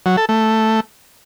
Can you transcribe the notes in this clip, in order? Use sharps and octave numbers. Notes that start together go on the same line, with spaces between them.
F#3
A4
A3